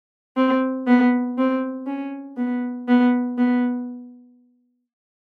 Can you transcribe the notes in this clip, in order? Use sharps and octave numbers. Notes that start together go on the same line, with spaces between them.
C4
B3
C4
C#4
B3
B3
B3